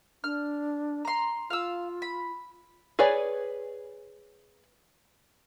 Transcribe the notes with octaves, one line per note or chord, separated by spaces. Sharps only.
D4 F6
A#5 C6
F4 F5 E6
B5
G#4 B4 C#5 D5 G#5